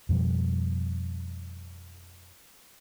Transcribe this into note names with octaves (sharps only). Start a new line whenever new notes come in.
F2 B2 F3 G3